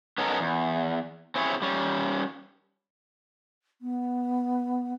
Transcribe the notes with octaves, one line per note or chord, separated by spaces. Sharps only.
B3 C#4 D#4 A4 A#4
E2
C4 C#4 E4 G#4 C5 C#5
G3 C#4
B3